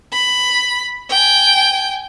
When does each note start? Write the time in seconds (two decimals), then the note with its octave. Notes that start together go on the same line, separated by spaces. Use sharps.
0.13 B5
1.10 G5 G#5